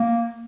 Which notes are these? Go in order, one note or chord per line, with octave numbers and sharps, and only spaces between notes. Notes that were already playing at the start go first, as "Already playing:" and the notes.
Already playing: A#3